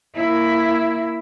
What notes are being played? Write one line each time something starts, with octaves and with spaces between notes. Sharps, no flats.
A#3 E4